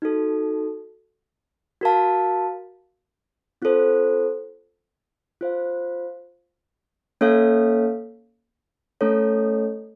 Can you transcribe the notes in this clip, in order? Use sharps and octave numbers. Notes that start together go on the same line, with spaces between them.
D#4 F#4 A4
F#4 A#4 F5 A5
C4 F4 A4 C5
F4 C5 F5
A#3 C#4 A4 C#5 F5
A3 C#4 A4 C#5